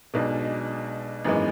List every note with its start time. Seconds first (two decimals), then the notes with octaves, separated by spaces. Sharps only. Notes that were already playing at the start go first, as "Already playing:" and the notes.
0.14 B1 B2 G#3 D4
1.25 G#1 F#2 E3 G#3 B3